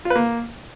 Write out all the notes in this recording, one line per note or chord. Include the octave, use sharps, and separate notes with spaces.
F4
B4
A#3